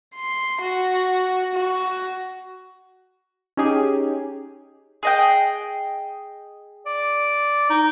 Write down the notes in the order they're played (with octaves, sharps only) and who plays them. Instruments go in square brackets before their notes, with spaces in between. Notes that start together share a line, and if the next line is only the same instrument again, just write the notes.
[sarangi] C6
F#4
F#4
[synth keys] C#4 D#4 G4 G#4
[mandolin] G#4 D#5 G5
[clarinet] D5
D#4